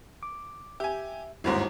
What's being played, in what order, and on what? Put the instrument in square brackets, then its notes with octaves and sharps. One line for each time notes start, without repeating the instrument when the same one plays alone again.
[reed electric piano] D6
[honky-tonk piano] G4 G#5 [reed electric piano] E5
[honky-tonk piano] G1 D#2 G#2 [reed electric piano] E4 F#4 C5